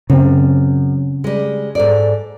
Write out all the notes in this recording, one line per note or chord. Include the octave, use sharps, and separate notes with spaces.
F#2 C#3 C4
G3 G#3
G#2 A4 D5